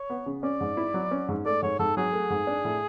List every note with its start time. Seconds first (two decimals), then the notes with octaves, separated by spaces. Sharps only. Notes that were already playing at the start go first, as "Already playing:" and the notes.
Already playing: C#5
0.10 B3
0.26 C#3
0.43 C#4 D5
0.61 G#2
0.77 E4
0.94 F#3
1.11 C#4
1.29 G#2
1.46 A3 D5
1.63 G#2 C#5
1.79 G#2 A4
1.97 F#3 G#4
2.13 A3
2.30 G#2
2.47 D4
2.65 A2